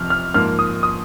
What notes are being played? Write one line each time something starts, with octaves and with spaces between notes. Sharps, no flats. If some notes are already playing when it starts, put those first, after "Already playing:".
Already playing: F2 C3 F3 F6
F6
G#2 F3 A#3 F6
D#6
D#6